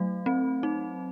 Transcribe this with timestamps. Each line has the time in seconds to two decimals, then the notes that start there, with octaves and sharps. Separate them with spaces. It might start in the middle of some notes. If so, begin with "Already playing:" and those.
Already playing: F#3 A3
0.26 C4
0.63 D#4